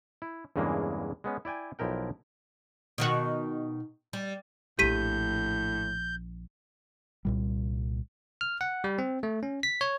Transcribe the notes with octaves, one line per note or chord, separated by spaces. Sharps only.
E4
E2 G2 C#3 E3 G#3 A#3
G#3 B3 C#4
E4 D5 G5 G#5
B1 F3 E4 A#4 G5
B2 D#3 F#4
G3
A#1 A2 F3 G4 G6 B6 D#7
C2 A#2 G3
F6
F#5
G3
C4
A3
C#4
B6
C#5